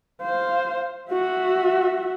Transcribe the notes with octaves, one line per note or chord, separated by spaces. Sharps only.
C5 F5
F#4 E5